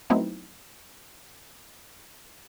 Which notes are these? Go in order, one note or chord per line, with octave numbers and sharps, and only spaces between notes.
F#3 A3 B3 C4 D#4 E4